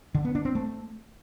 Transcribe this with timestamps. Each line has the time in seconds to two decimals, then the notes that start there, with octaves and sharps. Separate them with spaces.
0.15 D3
0.25 B3
0.35 D4
0.45 C4
0.55 A3